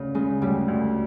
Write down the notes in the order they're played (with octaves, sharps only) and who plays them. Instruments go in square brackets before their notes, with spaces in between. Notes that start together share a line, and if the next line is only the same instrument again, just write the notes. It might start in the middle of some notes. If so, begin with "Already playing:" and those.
Already playing: [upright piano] D2 C#3
[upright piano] C#3 [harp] G#3
[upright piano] D2 [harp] G3
[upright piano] D2